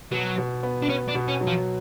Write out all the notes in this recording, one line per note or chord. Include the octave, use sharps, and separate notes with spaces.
B2 F#3
B2
B3
D4
B3 C#4
D4
B2
C#4
F#3
F3